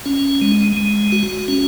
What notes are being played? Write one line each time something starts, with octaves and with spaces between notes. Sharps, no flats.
C#4
G#3
G#3
F#4
C#4